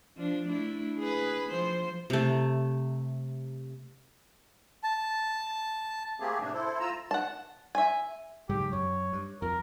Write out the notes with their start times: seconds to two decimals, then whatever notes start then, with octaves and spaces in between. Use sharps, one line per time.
0.17 F3 D4
0.47 A3 D4 E4
0.98 G#4 B4
1.49 F3 C5
2.10 C3 A3
4.84 A5
6.20 A3 A#3 C4 G4 G#4
6.41 A2 C3 A3 D4
6.54 E4 A4 C5
6.80 F4 A#5 E6
7.11 F#5 A5
7.75 E5 G#5
8.49 G#2 C#3 F#3 G4
8.72 F#2 C#5
9.13 G2
9.42 F2 A#4